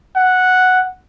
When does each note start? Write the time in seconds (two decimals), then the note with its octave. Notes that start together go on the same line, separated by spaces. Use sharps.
0.16 F#5